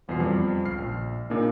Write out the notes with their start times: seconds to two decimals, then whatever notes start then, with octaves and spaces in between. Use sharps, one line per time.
0.08 G1 E2 B2 F4 C7
0.20 F2 F3 G3
0.65 C#2 F6 C7
0.78 A#1
1.30 A#2 C#3 A#3 D4 D#4